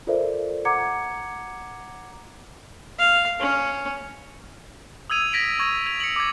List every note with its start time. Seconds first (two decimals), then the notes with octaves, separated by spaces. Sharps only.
0.07 F4 A4 A#4 C5 D5 E5
0.65 F#5 A#5 D6 G#6 C#7
2.99 F5
3.40 C#4
5.10 D#6 E6 G#6 D#7 F7
5.33 G#6 A#6 B6 D7
5.59 C#6 G#6 A#6
5.86 G#6 F7
6.00 C#7 F#7
6.16 D6 G#6